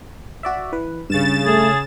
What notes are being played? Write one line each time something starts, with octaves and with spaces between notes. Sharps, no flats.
F#4 D5 E5
E3 B4
G2 C#3 A6 E7
A3 G#4